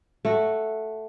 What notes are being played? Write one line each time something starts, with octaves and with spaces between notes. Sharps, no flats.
A3 F#4